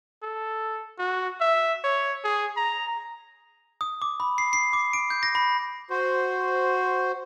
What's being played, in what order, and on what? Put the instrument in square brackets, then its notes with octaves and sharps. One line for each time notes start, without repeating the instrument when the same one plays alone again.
[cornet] A4
F#4
E5
C#5
G#4
A#5
[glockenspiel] D#6
D6
B5
C7
C7
D6
D7
G6
A#6
B5
[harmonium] F#4 C5